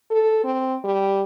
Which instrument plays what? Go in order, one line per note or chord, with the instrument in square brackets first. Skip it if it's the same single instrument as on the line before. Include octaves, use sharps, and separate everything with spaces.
[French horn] A4
C4
G3